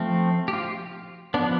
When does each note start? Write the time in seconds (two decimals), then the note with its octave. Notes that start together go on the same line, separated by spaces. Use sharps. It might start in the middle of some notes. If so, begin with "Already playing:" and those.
Already playing: F3 A3 C4
0.48 G4
0.53 F4
1.34 F3 B3 D4